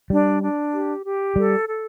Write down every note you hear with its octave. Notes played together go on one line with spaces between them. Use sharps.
G3 D4
D4
G4
G4
G3 A4
A4